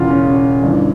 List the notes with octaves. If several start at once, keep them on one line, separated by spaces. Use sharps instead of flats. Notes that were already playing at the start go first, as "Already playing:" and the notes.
Already playing: E1 E2 C#3 F4
C#4
C#4
G1 G2 E3